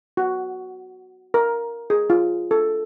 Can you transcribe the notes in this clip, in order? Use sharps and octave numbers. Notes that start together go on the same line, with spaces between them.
F#4
A#4
G#4
F4
A4